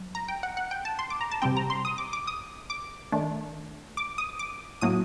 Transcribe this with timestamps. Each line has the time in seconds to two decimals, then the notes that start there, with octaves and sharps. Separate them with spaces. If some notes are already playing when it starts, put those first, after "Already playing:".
Already playing: F#3
0.15 A#5
0.28 G5
0.43 F#5
0.57 F#5
0.71 G5
0.85 A5
0.99 C6
1.10 D6
1.21 A#5
1.31 A5
1.42 C3 G3 C4 G5
1.57 A#5
1.70 C6
1.85 D#6
1.98 D6
2.13 D6
2.27 D#6
2.70 D6
3.12 D#3 A3 D4
3.97 D6
4.18 D#6
4.39 D6
4.81 A2 F#3 A#3 D#6